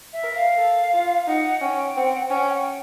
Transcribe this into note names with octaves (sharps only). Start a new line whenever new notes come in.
E5
A#4
F5
A4
F4
D#4 F#5
C#4 G5
C4 F#5
G5
F#5
G5
C#4 F#5
G5
F#5
G5